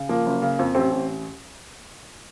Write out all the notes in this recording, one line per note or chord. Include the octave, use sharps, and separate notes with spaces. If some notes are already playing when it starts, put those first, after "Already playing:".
Already playing: C#3
F3 A#3
F#1
C#3
F2
A1 C4
A1